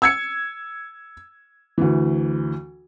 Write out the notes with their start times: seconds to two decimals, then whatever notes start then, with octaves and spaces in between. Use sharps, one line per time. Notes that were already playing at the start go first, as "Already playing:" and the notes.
0.02 E6 G#6 C#7
1.78 D2 E3